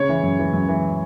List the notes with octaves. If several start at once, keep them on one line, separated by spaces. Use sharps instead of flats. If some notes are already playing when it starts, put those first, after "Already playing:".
Already playing: C#3 C#5
E3
F#2
E3
F#2
E3